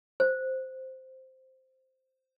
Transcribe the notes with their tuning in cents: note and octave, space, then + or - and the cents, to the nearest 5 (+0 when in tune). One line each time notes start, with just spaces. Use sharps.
C5 -5